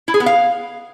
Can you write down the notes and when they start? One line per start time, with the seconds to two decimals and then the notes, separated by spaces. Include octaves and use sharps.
0.08 E4
0.14 G#4
0.20 B3
0.26 F5